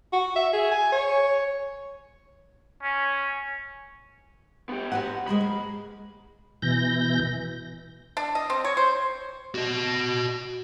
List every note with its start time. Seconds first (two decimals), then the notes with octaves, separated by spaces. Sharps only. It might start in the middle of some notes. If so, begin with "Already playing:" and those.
0.13 F#4
0.36 E5
0.53 G#4
0.71 G#5
0.92 C#5
2.82 C#4
4.69 B3 G4
4.92 F#4 B4 F#5
5.27 G#3 A#4 C5 B5
5.41 A#3
6.62 B2 E3 G6 A#6
8.17 D4
8.35 D#5
8.50 C4
8.64 C#5
8.77 C5
9.55 F#4 D#5